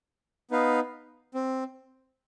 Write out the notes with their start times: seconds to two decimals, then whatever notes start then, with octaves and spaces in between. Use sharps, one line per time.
0.51 B3 D#4 B4 F5
1.34 C4